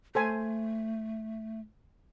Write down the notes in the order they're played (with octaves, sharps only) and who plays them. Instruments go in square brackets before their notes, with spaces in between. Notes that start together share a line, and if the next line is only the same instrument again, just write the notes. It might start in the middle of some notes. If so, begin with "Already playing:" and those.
[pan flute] A3 [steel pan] A4 C5 G#5